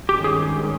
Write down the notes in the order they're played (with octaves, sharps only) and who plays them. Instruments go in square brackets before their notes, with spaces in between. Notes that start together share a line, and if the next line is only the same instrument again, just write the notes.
[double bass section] G#1 G2 D#3 G#3 C#4 [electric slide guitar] G4
[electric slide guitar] G#4